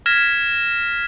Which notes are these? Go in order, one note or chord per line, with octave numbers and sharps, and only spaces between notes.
F6 G#6 A#6 B6 E7